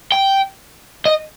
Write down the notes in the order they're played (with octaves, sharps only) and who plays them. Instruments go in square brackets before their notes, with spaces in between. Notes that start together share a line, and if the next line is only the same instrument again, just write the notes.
[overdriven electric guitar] G5
D#5